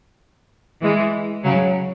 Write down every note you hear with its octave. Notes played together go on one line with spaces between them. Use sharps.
E3 G#3
C#3 F#3